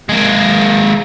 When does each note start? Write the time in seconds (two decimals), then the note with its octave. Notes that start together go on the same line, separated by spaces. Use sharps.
0.09 G#3 A#3